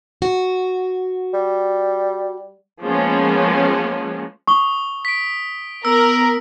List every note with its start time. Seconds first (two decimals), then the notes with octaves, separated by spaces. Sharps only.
0.22 F#4
1.34 G3
2.82 F3 G#3 A#3 B3 C#4
4.48 C#6 D#6 G7
5.05 B6 D7
5.85 B3 A#4 E6